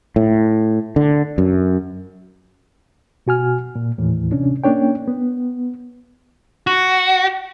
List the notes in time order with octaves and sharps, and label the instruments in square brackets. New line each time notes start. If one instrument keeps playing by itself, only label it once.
[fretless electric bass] A2
D3
F#2
[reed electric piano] B2 F#4 G#5 F6
A#2
D#2 A2 E3
C3 C#4 D4
A#3 C#4 D4 C#5 G5
B3
[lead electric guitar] F#4